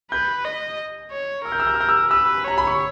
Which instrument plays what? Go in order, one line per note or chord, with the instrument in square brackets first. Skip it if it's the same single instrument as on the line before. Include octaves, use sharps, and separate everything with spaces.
[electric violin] B4 [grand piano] G6
[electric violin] D#5
C#5
[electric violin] A#4 [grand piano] E6
[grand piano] G6
E6
G6
E6
G6
E6
[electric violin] B4 [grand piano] E6
[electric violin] C#5 [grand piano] A#5
[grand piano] B5
C#6